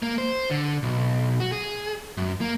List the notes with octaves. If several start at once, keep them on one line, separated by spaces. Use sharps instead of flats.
A#3
C5
D3
B1
F#4
G#4
F#2
A#3